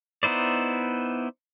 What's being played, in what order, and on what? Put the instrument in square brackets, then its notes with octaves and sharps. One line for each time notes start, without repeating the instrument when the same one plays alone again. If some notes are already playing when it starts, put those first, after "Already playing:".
[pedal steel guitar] B3 D#4 E4 C5 D5